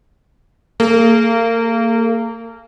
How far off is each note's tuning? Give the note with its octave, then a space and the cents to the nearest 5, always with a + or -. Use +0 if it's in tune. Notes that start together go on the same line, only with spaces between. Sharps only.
A#3 -30 G#4 +25